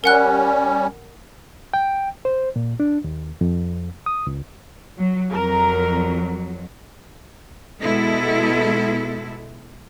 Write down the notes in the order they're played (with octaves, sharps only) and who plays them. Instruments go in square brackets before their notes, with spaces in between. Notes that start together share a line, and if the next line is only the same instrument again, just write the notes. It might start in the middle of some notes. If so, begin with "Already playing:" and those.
[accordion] G3 C#4 [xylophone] A#4 F#5 F#6
[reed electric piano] G5
C5
A#2
D4
D#2
F2
D#6
C#2
[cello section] F#3
[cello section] F2 F#3 [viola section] A#4 A#5
[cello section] B2 G#3 B3 E4 A4